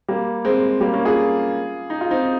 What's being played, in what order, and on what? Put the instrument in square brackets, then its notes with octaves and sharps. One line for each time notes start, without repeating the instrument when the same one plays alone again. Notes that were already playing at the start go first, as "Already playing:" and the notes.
[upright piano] G3 A#3
G#3 C4
G3 A#3
A#3 C#4
F4 G#4
D#4
F4
C4 D#4